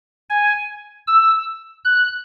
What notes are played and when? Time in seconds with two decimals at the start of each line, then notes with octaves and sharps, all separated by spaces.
0.30 G#5
1.07 E6
1.85 F#6